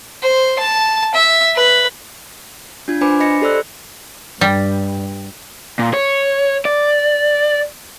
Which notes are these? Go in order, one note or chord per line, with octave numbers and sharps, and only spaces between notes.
C5
A5
E5
B4
D4 F4 G#6
D4 B4 C5 G#5 B5 D6
D#5 B5 A#6 C#7
G4 A4 C5 D5 E6 F#6
G2 G3
A#2
C#5
D5